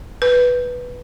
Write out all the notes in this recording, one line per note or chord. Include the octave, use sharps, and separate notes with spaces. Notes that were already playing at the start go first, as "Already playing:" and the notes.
B4